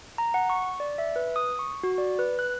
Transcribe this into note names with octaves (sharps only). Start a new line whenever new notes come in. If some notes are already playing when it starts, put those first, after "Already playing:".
A#5
F#5
C#6
D5
E5
B4
D#6
C#6
F#4
D5
B4
F#6